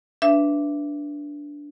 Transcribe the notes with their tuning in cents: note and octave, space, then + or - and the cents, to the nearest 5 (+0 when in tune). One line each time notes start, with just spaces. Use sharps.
D4 -10 B4 +0 E5 +20